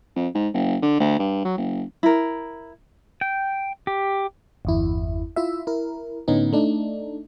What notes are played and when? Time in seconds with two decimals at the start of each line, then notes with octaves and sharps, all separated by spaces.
0.16 F2
0.35 G#2
0.54 F#1
0.82 D3
1.00 D2
1.19 G2
1.45 F#3
1.57 F#1
2.03 E4 A#4
3.21 G5
3.87 G4
4.65 G1 E2 E4
5.36 E4 F4 E5
5.67 E4 A#4
6.28 A2 D3 B3 C#4 D#4
6.53 A3 D4 D#4